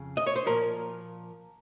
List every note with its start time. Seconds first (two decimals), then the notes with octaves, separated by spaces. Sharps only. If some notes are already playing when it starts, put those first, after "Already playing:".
Already playing: F2 C#3
0.17 D#5
0.26 C#5
0.36 C5
0.46 A#2 F3 A#4